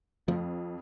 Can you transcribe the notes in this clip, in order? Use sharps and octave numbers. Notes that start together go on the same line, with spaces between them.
F2 F3